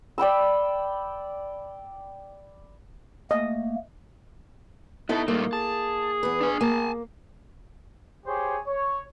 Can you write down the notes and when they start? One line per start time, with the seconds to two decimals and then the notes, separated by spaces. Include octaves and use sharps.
0.18 D5 G5 B5 E6
3.31 A3 A#3 D#5
5.09 B3 D#4 E4 A4 D#5 A5
5.28 A#2 G3 A3 A#3
5.53 G#4 A5
6.23 E2 B4
6.41 D4 G#5
6.61 A#3 G#5 A5
8.26 G4 G#4 C5 C#5
8.65 C#5